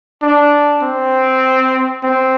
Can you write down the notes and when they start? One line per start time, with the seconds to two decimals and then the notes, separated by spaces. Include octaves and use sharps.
0.22 D4
0.82 C4
2.04 C4